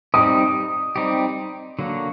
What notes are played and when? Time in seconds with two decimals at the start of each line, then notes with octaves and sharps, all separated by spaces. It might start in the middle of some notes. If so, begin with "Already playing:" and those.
0.14 G3 C4 D#4 G4 D#6
0.96 G3 C4 D#4 G4
1.79 D3 F#3 A#3 F#4